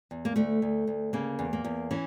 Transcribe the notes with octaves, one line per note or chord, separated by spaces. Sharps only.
E2
A#3
D2 A3
D2
D2
C#3 A#3
E2
A#3
E2
E3 C#4